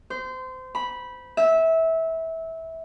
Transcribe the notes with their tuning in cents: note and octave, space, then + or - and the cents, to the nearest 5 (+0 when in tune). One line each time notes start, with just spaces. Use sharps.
C5 -25
B5 -10
E5 -20